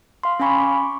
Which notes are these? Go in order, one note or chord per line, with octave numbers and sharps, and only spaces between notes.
F5 C6
C#4 F5 G#5 B5 C#6
C#6 D6